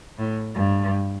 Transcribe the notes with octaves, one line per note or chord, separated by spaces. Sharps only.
A2
G2